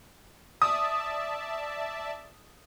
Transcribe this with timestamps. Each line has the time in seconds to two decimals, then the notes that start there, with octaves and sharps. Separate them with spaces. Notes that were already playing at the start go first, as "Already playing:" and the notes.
0.62 D5 E5 A5 D#6